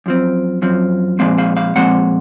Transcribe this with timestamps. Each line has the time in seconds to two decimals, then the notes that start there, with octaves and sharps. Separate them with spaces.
0.06 F#2 F3 C4
0.62 F#2 F3 C4
1.19 A#2 F3 G#3 C4 F5
1.38 F5
1.57 F5
1.76 A#2 F3 G#3 C4 F#5